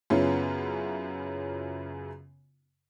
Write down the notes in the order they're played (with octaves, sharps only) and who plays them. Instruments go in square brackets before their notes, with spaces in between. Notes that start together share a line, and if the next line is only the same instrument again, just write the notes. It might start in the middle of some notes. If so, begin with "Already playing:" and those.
[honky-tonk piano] F#2 C#3 B3 C#4 E4 F4